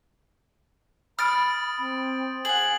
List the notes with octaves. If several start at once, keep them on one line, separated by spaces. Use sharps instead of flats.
B5 D#6 F6 A6 D7
C4
G#4 F#5 F#7